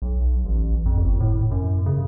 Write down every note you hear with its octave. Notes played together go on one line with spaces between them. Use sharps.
B1
A1
F2
G1
A2
F#2
C#3